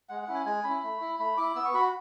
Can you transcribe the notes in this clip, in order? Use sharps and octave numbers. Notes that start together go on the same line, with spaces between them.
G#3 F#5
F#5
C#4 E4
G#5
G#3 G#5
C#4 E4 B5
A3
E4
A3 B5
E4 D6
B3 E6
C#6
F#4 B5